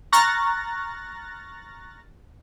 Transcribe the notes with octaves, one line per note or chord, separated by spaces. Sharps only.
A#5 C#6 F6 F#6 A6 A#6